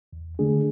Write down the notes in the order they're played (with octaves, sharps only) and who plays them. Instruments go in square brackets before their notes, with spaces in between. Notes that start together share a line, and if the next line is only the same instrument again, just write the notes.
[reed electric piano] E2
D3 A3 D4 G#4